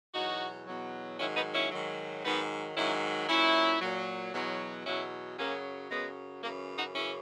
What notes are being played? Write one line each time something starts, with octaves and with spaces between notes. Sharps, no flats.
E2 B2 F#3 D#4 F#4
E2 B2 F#3
G#2 D#3 F#3 C#4 E4
B3 D#4
C#4 E4
G#2 D#3 F#3
G#2 D#3 F#3 B3 D#4
G#2 D#3 F#3 C#4 E4
A#2 F#3 C#4 E4
A#2 F#3
E2 B2 F#3
E2 B2 F#3 C#4 E4
F#2 C#3 F#3 A#3 C#4
F#2 C#3 F#3 G#3 B3
F#2 C#3 E3 A#3
D#4 F#4
F#2 C#3 E3 C#4 E4